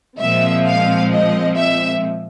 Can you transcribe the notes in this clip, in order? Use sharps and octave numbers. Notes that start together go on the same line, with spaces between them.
A#2 F3 G#3 C4 E5
F5
D#5
E5